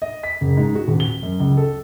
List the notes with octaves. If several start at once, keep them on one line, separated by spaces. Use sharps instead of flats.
D#5
B6
F#1
G#2
F#4
D#1
G7
F#2
C#2
A4